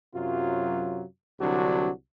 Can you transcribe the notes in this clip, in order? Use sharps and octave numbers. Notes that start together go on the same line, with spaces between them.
F#2 C3 F#3 F4
C2 D3 F#3 D4 F#4